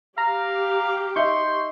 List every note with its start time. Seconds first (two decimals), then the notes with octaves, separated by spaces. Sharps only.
0.18 G4 F5 A#5
1.16 D#4 E5 C6 C#6 G6